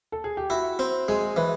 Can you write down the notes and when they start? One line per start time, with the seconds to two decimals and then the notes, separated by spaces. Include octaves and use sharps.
0.12 A4
0.24 G#4
0.37 G4
0.50 E4 F#4
0.79 C4
1.08 G#3 G#4
1.37 E3 B4